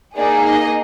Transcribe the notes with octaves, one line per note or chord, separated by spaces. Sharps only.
A#3 D#4 G#4 D5
D#5